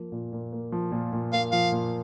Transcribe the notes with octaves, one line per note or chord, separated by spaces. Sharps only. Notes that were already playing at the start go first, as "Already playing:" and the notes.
Already playing: F3 A#3
A#2
A#2
A#3
F3
A#2
A#2
A#3 F5
F3 F5
A#2